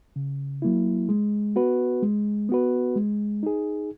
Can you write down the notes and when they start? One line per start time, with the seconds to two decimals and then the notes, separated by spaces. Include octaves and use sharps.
0.16 C#3
0.62 F#3 A#3 E4
1.09 G#3
1.56 B3 F#4 B4
2.02 G#3
2.49 B3 F#4 B4
2.96 G#3
3.43 D#4 G#4